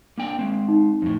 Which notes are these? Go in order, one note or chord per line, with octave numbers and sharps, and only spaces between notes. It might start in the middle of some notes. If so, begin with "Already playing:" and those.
A#3 D4 G5
G#3 C4
D#4
F2 A2